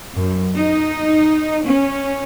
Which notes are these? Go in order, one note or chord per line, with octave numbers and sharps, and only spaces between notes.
F#2
D#4
C#4